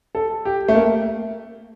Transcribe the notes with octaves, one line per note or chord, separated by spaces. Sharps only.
A4
G4
A3
A#3